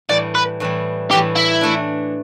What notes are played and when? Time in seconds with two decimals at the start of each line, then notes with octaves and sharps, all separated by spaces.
0.09 A2 E3 G3 D5
0.35 B4
0.60 A2 E3 G3
1.11 A2 E3 G3 G4
1.35 E4
1.61 E3 A3 D4